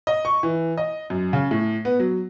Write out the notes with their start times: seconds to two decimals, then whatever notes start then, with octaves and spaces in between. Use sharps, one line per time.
0.07 D#5
0.25 C#6
0.43 E3
0.78 D#5
1.10 F#2
1.33 C#3
1.51 A2
1.85 B3
1.99 F#3